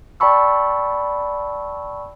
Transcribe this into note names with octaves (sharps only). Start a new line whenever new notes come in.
D5 G5 A5 B5 C#6 E6